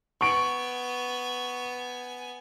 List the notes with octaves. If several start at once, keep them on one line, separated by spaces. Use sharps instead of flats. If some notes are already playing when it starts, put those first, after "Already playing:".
B3 G#5 C#6 D7